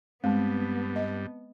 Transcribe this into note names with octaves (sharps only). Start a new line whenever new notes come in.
G2 G#3 B3 C4 A5
D#5